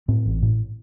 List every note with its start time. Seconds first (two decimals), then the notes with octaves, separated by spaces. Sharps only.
0.08 A2 C4
0.26 A1
0.42 A2